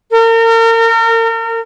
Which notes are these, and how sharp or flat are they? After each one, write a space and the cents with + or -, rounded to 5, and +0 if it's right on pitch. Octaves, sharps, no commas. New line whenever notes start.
A#4 -35